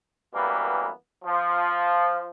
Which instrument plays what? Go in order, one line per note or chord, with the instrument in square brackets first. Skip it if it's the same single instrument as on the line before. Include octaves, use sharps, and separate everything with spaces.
[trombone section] F#2 E3 G3 A#3 B3
F3